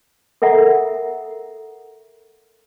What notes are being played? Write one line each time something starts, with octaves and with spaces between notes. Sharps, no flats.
A4 A#4 E5 F#5 A#5